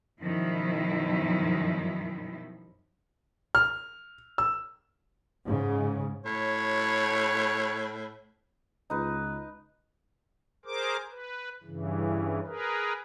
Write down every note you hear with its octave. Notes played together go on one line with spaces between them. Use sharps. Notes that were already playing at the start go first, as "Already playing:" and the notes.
F#2 B2 D#3 F3 G3 E4
F6
E6
G#2 C#3
A2 C#5
C#2 D#4 B4
G#4 A#4 C5 D6
B4
G2 C#3 E3
G#4 A#4 B4